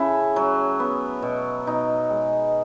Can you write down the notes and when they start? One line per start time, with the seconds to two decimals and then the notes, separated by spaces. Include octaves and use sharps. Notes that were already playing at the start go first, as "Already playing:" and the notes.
Already playing: C#3 A3 E4 G#4
0.36 F#3
0.80 B3
1.22 B2
1.67 B2 D#4
2.10 G#3